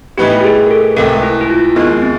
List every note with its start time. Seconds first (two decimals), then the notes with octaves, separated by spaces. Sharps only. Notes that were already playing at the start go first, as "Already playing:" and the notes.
0.18 A2 E3 G3 B3 D#4 G4
0.41 G4
0.44 G#4
0.66 A#4
0.71 A4
0.97 C#2 C3 E3 A3 A#4
1.23 E4
1.41 E4
1.50 F4
1.76 D#2 D#3 G#3 B3
2.02 C4